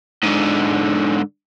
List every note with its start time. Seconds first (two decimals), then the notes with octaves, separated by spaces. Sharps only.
0.23 G#2 D3